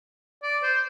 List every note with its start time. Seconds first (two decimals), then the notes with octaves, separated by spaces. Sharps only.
0.43 D5
0.63 C5